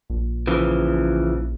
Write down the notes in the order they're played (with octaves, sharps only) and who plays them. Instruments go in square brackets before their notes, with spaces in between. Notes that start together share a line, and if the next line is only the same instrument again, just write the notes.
[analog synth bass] A#1
[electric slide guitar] C#3 E3 F3